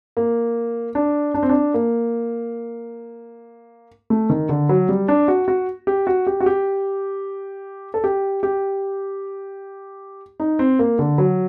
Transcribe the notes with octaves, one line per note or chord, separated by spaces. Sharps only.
A#3
D4
D4
C4
D4
A#3
A3
D#3
D3
F#3
G3
D4
F#4
F#4
G4
F#4
G4
F#4
G4
A4
G4
G4
D#4
C4
A#3
D3
F#3